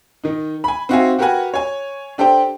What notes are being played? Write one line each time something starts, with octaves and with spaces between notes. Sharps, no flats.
D#3 D#4
G#5 B5
C4 D#4 F#4 E5 F5 G#5
F#4 G4 A#4 B4 F#5 G#5
C#5 G#5
D4 G4 A4 C5 G5